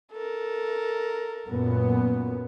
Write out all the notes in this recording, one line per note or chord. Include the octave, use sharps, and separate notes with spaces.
A4 A#4
F#2 A#2 B3